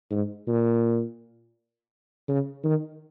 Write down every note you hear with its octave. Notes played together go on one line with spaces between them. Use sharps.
G#2
A#2
C#3
D#3